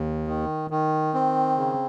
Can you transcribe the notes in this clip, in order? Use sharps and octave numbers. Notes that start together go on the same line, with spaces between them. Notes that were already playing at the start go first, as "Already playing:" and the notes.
Already playing: D#2
D#3
D#3
C4
C#3